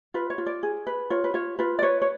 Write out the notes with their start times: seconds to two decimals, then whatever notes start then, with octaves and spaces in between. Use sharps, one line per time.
0.14 F4 B4
0.30 C#5
0.38 F4
0.46 D5
0.63 G#4
0.87 B4
1.10 F4 C#5
1.24 B4
1.34 F4 C#5
1.59 F4 B4
1.79 D5
1.82 B4 C#5
2.02 C#5